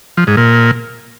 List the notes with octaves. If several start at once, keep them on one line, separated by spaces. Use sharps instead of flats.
F3
G#2
A#2